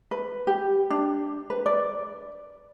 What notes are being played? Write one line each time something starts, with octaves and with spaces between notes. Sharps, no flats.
B4
G4
D4
B4
D5